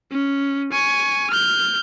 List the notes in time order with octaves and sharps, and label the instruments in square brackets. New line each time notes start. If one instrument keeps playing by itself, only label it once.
[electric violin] C#4
G#5 C#6
F6 G6